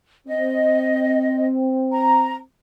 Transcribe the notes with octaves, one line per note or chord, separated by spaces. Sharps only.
C4 D#5
A#5